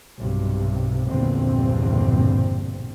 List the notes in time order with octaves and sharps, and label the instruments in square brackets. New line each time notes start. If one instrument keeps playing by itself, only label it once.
[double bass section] B1 G2 C3
A#1 E2 G2 B2 D3 C4